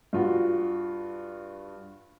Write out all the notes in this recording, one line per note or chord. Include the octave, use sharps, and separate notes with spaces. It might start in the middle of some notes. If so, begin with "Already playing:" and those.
G2 F4 F#4